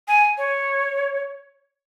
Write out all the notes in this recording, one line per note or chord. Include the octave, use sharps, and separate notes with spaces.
G#5
C#5